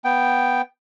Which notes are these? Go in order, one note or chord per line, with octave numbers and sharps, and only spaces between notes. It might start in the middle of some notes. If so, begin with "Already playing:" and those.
B3 G5